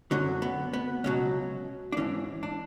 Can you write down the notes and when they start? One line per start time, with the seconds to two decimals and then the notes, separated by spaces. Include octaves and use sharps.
0.11 F#2 D3 F#3 C#4
0.42 B3
0.73 B3
1.04 C#2 B2 F#3 C#4
1.92 D4
1.97 G#2 E3 C#4
2.43 D4